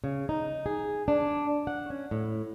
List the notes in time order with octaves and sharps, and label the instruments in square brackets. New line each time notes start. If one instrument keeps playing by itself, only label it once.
[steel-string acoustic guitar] C#3
D#4
G#4
D4
F#5
C#4
A2